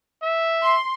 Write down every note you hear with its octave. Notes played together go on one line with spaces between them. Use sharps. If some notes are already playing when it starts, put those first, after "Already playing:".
E5
C6